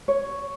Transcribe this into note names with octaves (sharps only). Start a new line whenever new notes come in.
C#5